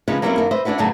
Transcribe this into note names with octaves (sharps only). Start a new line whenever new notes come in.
C#3 F3 G#3 C#4 D#4 B4
F#3 G3 A#3 C4 C#4 E4
F#2 D#3 A#3 D4
B4 C5 D#5 E5
C#4 D4 E4 F#4 B4
F#2 A2 C#3 F#3 B3 A5